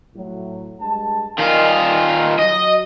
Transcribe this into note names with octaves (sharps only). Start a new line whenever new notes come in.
A2 F#3
G2 G#3 A5
D#3 F4 D5 G5 G#5
F#3 D#5